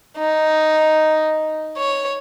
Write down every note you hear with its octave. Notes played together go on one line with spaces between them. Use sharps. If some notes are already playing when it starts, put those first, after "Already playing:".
D#4
C#5